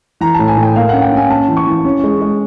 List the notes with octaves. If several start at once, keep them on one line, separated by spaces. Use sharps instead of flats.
E3 A#5
A2 A5
G#5
A2
G5
A#3 F5
C#4 F#5
G5
C#4 G#5
C#4 A5
E3
C#6
E3
C#4
G#3
G#3